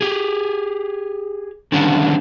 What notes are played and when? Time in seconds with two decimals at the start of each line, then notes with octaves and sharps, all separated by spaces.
0.01 G4 G#4
1.72 D3 D#3 G3 B3 C#4 D4